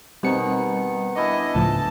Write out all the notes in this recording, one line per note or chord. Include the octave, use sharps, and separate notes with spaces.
B2 D#3 G3 C4 C#7
D4 E4 D#5 G#5
C#2 A2 F3 A5